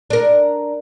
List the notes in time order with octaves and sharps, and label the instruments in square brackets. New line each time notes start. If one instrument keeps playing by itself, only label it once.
[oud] D4 A#4